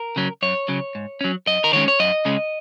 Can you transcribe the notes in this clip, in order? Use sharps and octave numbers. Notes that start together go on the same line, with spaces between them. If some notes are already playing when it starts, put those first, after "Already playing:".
Already playing: A#4
C#3 F#3 C#4
F#2 C#5
C#3 F#3 C#4
G#2
F#3 C#4
F#2 D#5
A#4
D#3 G#3 C#4 C#5
C#5
F#2 D#5
C#3 G#3 C#4